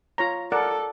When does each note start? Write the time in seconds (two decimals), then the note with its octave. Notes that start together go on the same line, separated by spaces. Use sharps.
0.18 F4 C#5 A#5
0.52 A4 A#4 D5 F#5